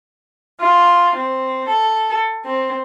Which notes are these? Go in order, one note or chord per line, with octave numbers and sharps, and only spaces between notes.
F4
C4
A4
C4